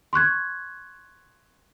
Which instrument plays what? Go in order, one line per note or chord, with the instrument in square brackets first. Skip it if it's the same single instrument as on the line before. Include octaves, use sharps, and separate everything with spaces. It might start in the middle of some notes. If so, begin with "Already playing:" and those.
[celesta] C6 C#6 F#6 G#6